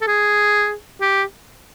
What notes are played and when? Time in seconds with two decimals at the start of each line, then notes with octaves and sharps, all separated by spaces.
0.01 A4
0.08 G#4
1.01 G4